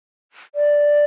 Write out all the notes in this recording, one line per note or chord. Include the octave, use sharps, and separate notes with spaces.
D5